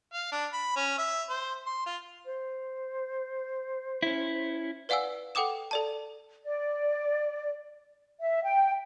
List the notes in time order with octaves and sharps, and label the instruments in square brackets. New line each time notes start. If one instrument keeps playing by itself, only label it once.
[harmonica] F5
D4
B5
C#4
E5
C5
C6
F4
[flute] C5
[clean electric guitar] C#4 E4
[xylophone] B4 D5 F5 F#5 G#5 E6
A4 F#5 G5 D6 D#6 E7
A4 D5 A5
[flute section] D5
E5
G5